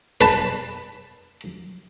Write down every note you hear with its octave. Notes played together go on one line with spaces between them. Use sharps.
B4 A5